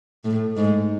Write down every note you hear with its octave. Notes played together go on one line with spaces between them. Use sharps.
A2
G#2